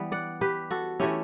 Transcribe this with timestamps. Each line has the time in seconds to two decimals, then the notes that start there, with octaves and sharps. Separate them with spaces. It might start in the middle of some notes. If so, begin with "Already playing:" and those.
Already playing: E3 G3 B3
0.12 D5 F#5
0.41 G4 B4
0.71 F#4 A4
1.00 E3 A3 C#4 E4 G4